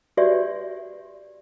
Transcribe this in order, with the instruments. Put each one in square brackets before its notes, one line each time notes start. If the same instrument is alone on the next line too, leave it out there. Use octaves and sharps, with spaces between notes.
[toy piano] F#4 G4 B4 C#5 D5 E5